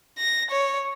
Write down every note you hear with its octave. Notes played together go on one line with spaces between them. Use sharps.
A#6
C#5